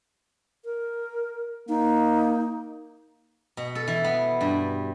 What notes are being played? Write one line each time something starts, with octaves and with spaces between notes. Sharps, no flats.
A#4
A#3 D#4
B2
A4
E3
B3
G2